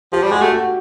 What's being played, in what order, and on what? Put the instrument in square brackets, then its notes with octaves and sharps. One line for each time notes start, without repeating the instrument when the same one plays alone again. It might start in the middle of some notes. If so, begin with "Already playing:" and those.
[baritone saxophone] F3 [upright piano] G4
[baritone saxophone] G3
[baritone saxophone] G#3 [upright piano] F#4
[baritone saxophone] A3
[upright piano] F#4